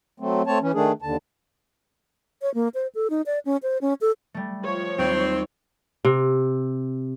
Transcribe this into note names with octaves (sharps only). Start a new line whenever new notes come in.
F#3 A3 C4
A3 C4 C#5 A5
E3 C#4
D#3 A3 D4 G#4
D#2 D3 A5
C#5
A#3
C5
A4
D#4
D5
C#4
C5
C#4
A4
G3 A3
F3 C#5
D#2 G3 C4
C3